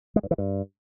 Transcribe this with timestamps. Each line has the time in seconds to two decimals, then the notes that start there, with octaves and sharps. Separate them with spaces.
0.16 G#3
0.23 G2
0.31 E3
0.38 G2